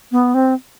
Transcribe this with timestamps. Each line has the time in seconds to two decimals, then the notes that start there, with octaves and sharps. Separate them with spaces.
0.12 B3
0.34 C4